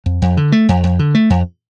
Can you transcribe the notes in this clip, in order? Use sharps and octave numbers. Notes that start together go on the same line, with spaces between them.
F2
F2
D3
A3
F2
F2
D3
A3
F2